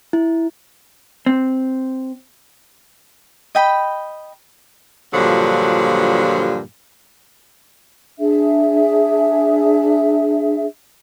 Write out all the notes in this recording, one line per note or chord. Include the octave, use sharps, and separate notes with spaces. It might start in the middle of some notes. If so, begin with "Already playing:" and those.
E4
C4
D#5 G5 B5
G2 A#2 D3 F3 F#3
D4 G#4 E5